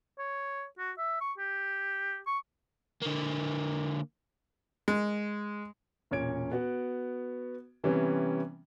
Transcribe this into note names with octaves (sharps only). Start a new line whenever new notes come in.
C#5
F#4
E5
C#6
G4
C#6
D3 A#3
G#3
E1 A#2 C#4 C#5 G#6 D7
B3 F#4
C3 E3 G3 B3 C#4